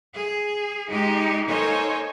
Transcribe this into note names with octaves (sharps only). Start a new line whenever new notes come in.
G#4
G#3 D#4 G4
A#3 D#4 A4 C5 C#5 G#5